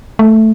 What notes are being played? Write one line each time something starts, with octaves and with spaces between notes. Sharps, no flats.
A3